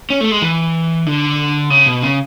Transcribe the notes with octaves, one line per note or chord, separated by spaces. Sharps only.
C#4
A3
G#3
E3
D3
C#3
B2
C#3